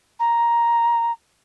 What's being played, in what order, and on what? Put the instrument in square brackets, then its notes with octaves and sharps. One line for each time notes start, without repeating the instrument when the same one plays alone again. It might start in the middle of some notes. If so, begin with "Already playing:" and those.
[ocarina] A#5